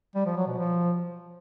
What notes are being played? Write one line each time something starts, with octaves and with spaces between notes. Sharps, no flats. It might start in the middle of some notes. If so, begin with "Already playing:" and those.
G3
F3
F#3
B2
F3